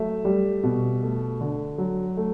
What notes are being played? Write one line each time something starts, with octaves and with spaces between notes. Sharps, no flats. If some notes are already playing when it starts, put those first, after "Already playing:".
Already playing: F#3 A3 E5
G3
B2
A3
D3
F#3
A3